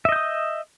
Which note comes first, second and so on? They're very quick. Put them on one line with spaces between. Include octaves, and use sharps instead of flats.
E5 D#5 G6 D#6